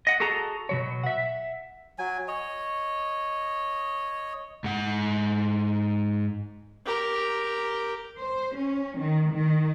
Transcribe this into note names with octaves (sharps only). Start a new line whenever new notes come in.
D#5 F#5
F#4 G#4 A4 A5 A#5
B2 F#3 C#5
E5 F#5
F#3 G#5
C#5 D#5
G#2 F#5
G4 A#4
C5
C#4
D#3
D#3